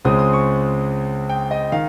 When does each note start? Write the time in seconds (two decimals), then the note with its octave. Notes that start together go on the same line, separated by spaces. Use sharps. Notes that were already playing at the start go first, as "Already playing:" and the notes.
0.05 C#2 C#3 G#3 C4 D#6
0.19 D#6
0.33 C#6
1.30 G5
1.51 D#5
1.72 D#3 F5